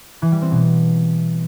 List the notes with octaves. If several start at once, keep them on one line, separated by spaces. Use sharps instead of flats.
E3
G3
C4
B2